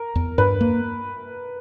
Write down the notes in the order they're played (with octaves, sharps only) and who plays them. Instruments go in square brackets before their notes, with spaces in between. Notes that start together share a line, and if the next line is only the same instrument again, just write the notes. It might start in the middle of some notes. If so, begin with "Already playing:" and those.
Already playing: [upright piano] A#4
[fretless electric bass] E2
[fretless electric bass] G2 [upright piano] B4
[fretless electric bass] A#3